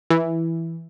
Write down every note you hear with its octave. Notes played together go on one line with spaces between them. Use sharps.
E3